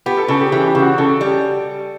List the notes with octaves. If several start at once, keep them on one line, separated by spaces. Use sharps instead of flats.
B3 G4
A4
C#3 A4
G4
E3 G4
G4
C#3
F#4
C#3 A4
G3